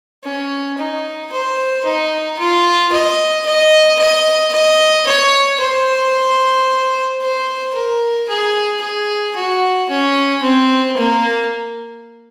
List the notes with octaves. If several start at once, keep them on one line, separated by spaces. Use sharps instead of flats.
C#4
D#4
C5
D#4
F4
D#5
D#5
D#5
D#5
C#5
C5
C5
A#4
G#4
G#4
F#4
C#4
C4
A#3